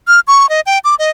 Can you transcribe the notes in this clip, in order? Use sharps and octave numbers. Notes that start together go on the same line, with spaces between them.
F6
C#6
D#5
G5
D6
D#5